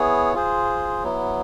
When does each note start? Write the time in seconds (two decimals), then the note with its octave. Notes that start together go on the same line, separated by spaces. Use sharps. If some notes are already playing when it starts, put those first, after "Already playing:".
Already playing: B3 E4 G#4 C#5
0.34 F4 G#4 C5
1.03 F#3 B3 E4